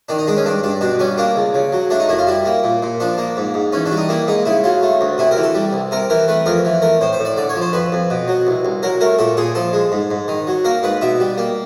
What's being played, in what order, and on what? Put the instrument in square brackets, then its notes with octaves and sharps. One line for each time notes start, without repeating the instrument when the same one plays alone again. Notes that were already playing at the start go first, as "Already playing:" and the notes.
[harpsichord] D#3 D4
D#4
G#3 D4
C#4
G2 D4
G2 D4
B2 D4
G3 C#4
A#3 D4
C#2
C#3
F#3
A3 D4
D#4
F#2 E4
F4
G3 E4
A#3
A#2
A#2
F3 D4
A#3
G#2
G#2
E3 C#4
D4
G3
D#4
A#3 E4
G#2 D#4
C#3 E4
F#3 F4
A3
D2
C3 E4
A#4
E3
A4
G3
C2
C3 A#4
E3 A#4
A3 B4
F2 A#4
E3
A3 A#4
A2 C5
C5
A2
D5
D3 D5
C#5
F3
C5
F2 B4
F2
B2
F#3
C2
C2
F#3 A#4
A3 A#4
A#2 A4
A#2 G#4
F3 A4
G#3
G#2
G#2
D#3
F#3
A#3 A#4
G#2 B4
B2 E5
G3
A#3